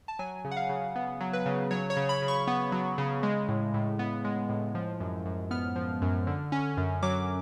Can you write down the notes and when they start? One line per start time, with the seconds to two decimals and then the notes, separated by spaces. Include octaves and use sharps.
0.08 A5
0.19 F#3 G#5
0.45 C#3
0.51 F#5
0.57 F5
0.69 C#3
0.96 B3
1.20 F#3
1.33 B4
1.46 C#3
1.71 F#3 C#5
1.90 C#5
1.97 C#3
2.09 B5
2.22 C#3
2.28 C#6
2.47 B3
2.72 F#3
2.98 C#3
3.23 G#3
3.48 A2
3.74 A2
3.99 B3
4.25 G#3
4.49 A2
4.75 F3
5.00 F#2
5.25 F#2
5.51 B3 F6
5.76 F3
6.02 F#2
6.27 D3
6.52 C#4
6.77 F#2
7.02 F#3 D6